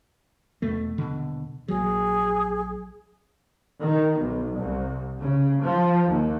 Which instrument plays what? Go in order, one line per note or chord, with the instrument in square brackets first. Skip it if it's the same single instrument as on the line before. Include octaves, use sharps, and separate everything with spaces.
[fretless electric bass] E2 B2 A3
D#1 B2 D3
[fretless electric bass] A#1 F#3 [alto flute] G#4
[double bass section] D#3
B1
C2
C#3
F3
D#2